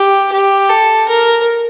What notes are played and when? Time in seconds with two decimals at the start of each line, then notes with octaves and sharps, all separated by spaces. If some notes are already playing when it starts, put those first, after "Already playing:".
Already playing: G4
0.32 G4
0.70 A4
1.08 A#4